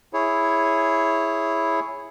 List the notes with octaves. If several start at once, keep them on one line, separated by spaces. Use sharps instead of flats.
E4 G#4 C#5